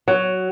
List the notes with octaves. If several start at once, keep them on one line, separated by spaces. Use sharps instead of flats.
F#3